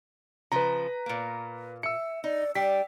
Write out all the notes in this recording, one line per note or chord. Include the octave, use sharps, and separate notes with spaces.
C#3 F3 B4 A#5
A#2 A#3
E5 E6 C#7
D#4 D5
G3 D4 G5 B6